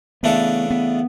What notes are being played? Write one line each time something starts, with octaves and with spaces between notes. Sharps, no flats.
C#3 E3 A3 B3 D4 A4
B3